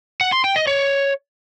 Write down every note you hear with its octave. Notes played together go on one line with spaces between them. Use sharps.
F#5
C6
G5
D#5
C#5